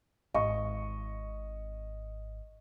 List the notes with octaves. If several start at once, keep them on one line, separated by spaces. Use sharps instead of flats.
G#1 D#5 C#6